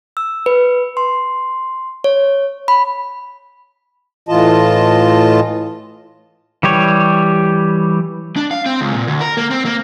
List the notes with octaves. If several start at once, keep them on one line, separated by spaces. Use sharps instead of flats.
E6
B4
C6
C#5
B5
A2 E3 F4 D#5 A5
E3 G3 G4 C#5
D4
F5
C4
C#2
A#2
D2
A#4
A#3
C4
A#3